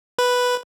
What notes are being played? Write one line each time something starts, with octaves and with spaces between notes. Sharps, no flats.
B4